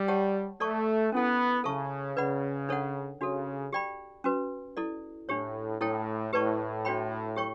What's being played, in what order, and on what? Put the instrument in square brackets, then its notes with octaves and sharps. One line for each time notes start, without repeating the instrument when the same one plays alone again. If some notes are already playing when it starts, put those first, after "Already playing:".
Already playing: [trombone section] G3
[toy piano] G4 C#5 F#5 A5
[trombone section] A3 [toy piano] A4 D5 A5 C#6
[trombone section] B3 [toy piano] C#4 E4 A4
[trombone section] C#3 [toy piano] A4 E5 A5 C#6
[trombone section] C#3 [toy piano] B4 D5 F#5 B5
[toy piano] D4 A4 C#5 F#5
[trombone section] C#3 [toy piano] D4 F#4 A4
[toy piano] G4 D5 G5 B5
C#4 F#4 B4
E4 A4 D5
[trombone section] A2 [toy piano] D4 G4 C#5
[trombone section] A2 [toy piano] E4 A4 C#5 G5
[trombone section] A2 [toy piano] G4 B4 D5 A5 C#6
[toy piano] D4 F#4 C#5 G5 B5
G4 C#5 G5 C#6